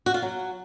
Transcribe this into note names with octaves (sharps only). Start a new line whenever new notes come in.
F#4
F4
F#3